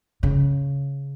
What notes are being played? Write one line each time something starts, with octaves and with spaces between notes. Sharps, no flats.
C#3